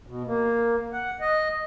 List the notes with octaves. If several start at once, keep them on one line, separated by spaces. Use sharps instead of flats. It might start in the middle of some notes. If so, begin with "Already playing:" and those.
B2
A#3
F#5
D#5